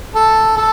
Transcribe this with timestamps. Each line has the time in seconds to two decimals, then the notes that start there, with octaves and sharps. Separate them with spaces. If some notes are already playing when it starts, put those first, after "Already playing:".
0.16 A4
0.57 A4